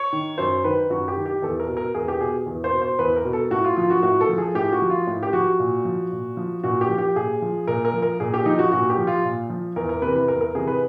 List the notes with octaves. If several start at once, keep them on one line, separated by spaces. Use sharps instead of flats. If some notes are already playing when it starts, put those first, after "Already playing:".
Already playing: C#5
D#3
F#2 C5
D#3 B4
F#2 F#4
G4
D#3
G4
E2 A4
A#4
B2
A#4
E2 G#4
G4
B2 G#4
E2
C5
B2
C5
E2 B4
A#4
B2
A4
A2 F#4
F4
F3 F4
F#4
A2 F#4
A4
F3
G#4
A2 G4
F#4
F3
F4
A2
G4
F3 F#4
A#2
F3
A#2
F3
A#2 F#4
G4
F3
G4
A#2 G#4
F3
A#2 A#4
A#4
F3
A#4
A#2 G#4
G4
F3 D#4
F#4
A#2 F#4
G4
F3
F4
A#2
F3
E2 A#4
A#4
C3 E3 B4
B4
E2 A#4
A#4
C3 E3 G#4
B4